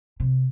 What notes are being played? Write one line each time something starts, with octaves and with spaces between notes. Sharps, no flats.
C3